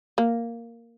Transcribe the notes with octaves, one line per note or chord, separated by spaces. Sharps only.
A#3